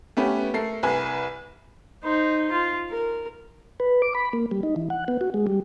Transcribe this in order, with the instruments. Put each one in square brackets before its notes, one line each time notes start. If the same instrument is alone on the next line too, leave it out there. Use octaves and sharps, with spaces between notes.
[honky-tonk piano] A3 B3 C#4 G4 B4
A3 A4 A#4 C7
C2 B4 G#5
[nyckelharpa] D#4 C5
F4
A#4
[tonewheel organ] B4
D6
B5
A#3
G3
D#4
E3
F#5
B3
F#4
G#3
G3